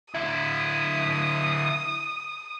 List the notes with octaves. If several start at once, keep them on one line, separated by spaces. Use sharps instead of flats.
D3 E4 D#6